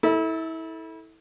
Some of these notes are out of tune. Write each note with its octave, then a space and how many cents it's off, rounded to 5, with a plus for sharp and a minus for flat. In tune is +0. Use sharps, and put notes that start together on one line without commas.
E4 -30 A4 +0